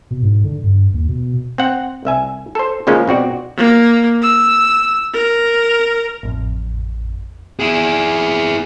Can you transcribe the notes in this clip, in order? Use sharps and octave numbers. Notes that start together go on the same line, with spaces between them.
B2
G#2
D3
G2
D#2
B2
C4 F#5
C2 E5 G#5
A4 C5
C#3 F3 G#3 A#3 C#4
B2 C4 F#4 D5
A#3
E6
A#4
A1 F2
E4 G#4